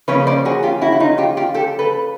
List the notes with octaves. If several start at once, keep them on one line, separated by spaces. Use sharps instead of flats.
C#3 F3 A#3 C#4 B4 C#5
C5 D5
F#4 G#4
F4 G4
E4 F#4
E4
D#4 F4
F4 G4
F4 G4
G4 A4
A4 B4